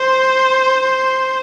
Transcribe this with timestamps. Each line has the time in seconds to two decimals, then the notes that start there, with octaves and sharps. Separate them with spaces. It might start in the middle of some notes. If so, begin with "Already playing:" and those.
Already playing: C5